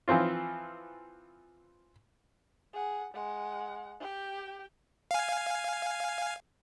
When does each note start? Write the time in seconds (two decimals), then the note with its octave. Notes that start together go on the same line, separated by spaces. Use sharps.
0.08 E3 F3 C4 F4
2.73 G#4 F#5
3.14 G#3 F#5
4.00 G4 G5
5.11 F5 G#5